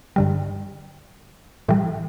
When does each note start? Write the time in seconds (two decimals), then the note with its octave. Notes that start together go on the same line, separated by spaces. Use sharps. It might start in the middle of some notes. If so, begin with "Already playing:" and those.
0.16 G2 D3 G3
1.68 A2 E3 G3